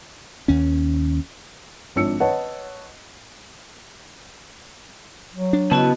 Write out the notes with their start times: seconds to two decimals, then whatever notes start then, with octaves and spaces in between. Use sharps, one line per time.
0.48 D#2 C#4
1.96 G#1 F3 D4 C#5 E6 C#7
2.20 B4 C#5 D#5 F#5 A5
5.34 F#3
5.53 D4
5.71 C#3 B3 E4 F#4 B4 D#5 A5